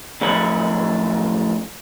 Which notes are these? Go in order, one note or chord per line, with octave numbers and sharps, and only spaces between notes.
F#2 A2 F3 D4 C#5 B5